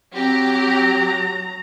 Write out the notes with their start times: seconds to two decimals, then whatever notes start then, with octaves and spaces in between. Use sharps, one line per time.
0.16 F#3 C4 G4 A#5